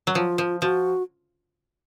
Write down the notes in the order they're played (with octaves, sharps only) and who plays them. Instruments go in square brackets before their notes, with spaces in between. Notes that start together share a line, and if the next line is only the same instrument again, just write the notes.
[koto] F#3
[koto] F3 [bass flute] F4
[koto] F3
[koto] F3 [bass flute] F#4